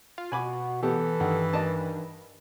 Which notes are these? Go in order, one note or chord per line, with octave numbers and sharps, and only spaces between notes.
F4
B2 F#4 G#5 B5 D6
E3 B3 G4 A4
G2 D#3 F#5
D#3 D5 D#5 A5